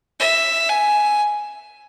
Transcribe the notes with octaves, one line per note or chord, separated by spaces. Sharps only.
E5
G#5